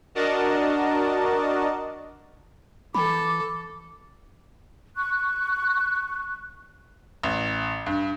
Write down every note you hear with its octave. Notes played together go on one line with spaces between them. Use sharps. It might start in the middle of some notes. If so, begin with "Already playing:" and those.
D4 F#4 A#4 D5 D#5 A5
E3 A4 B5 D6
C#6 F#6
A1
G2